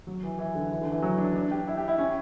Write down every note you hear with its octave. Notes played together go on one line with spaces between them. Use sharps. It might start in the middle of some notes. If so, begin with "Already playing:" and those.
F#3
E3
E3
D3
E3
D3
E3
F#3
D4
D4
G4
E4
G4
E4
C#4